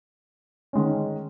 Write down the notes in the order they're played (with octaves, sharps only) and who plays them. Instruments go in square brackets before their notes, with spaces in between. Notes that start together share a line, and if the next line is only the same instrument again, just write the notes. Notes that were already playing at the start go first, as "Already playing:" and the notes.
[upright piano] D#3 G#3 C#4